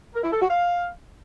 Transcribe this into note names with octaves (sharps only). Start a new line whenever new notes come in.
A#4
E4
A4
F#4
F5